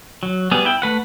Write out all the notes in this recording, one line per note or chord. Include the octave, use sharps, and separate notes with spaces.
F#3
G3 B3 G#4
E4 G5
A3 B4 F#5